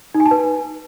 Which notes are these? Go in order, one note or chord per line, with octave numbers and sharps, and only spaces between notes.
D#4
G#5
A5
B4